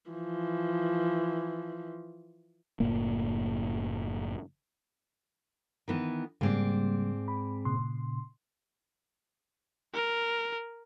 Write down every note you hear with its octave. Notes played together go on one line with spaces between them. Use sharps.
E3 F3
F#1 A2 A#3
D#3 E3 B3
G#2 C#3 G3 A#3 C4 D5
B5
A#2 C#3 C6
A#4